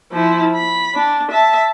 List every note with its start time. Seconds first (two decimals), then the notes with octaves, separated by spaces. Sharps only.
0.13 F3 E4
0.55 B5
0.94 D4
1.31 E5 A5